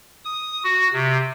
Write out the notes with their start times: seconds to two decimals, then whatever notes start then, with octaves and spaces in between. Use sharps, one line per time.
0.25 D#6
0.64 F#4
0.93 C3